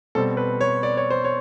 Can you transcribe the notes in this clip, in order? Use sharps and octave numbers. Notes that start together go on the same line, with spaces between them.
B2 G3 C4 A4
B4
C#5
D5
C#5
C5
C#5